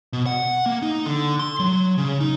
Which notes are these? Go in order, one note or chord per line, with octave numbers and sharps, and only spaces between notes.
B2
F#5
A#3
D#4
D3
C6
F#3
C#3
D#4